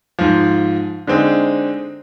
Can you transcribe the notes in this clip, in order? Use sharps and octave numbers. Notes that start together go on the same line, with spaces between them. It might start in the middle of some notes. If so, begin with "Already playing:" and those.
G#2 F3
D3 G#3 C4 D#4